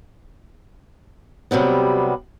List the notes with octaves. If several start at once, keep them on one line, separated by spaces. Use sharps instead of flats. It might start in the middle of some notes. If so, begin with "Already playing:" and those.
C3 F#3 G3 B3